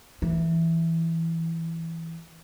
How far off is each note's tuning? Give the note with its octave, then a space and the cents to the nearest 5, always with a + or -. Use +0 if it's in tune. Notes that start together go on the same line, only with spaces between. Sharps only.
E3 +0